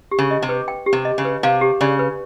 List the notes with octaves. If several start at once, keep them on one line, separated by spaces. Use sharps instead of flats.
G4
C#3
D#5
C3
B4
G5
G4
C3
D#5
C#3
B4
C3 F5
G4
C#3 D5
B4